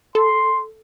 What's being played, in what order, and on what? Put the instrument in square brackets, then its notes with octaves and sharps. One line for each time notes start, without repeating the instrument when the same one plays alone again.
[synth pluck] A4 [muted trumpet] C6